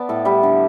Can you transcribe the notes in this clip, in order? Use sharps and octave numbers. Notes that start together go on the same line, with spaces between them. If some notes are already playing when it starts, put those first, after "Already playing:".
Already playing: B3 D5 A5
A2 A4
G3 E4
D3